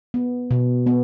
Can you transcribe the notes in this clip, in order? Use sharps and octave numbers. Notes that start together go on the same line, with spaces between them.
B3
B2
B3